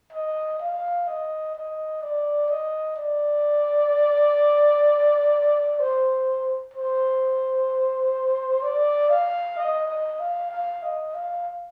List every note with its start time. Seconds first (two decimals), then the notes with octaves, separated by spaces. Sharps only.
0.13 D#5
0.60 F5
1.07 D#5
1.55 D#5
2.02 D5
2.50 D#5
2.96 D5
5.80 C5
6.74 C5
8.63 D5
9.10 F5
9.57 D#5
9.88 D#5
10.20 F5
10.51 F5
10.83 D#5
11.14 F5